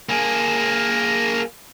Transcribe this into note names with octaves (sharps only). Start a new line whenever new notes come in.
A#3 G#4